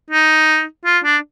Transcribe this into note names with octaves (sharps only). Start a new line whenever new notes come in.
D#4
F4
D4